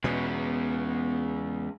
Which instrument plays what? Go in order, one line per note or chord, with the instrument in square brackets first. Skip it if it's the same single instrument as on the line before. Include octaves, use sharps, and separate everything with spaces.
[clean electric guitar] E2 [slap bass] B2 [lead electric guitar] G#3 C#4 [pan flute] B3